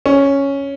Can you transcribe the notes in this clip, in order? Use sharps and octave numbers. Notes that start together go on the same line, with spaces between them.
C#4